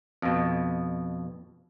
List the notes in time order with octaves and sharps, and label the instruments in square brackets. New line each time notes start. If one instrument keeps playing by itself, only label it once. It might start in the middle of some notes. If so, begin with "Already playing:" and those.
[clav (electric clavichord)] F2 B2